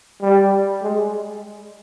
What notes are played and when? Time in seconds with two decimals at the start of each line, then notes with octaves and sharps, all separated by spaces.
0.22 G3
0.82 G#3